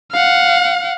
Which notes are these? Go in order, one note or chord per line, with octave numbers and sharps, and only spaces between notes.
F5 F#5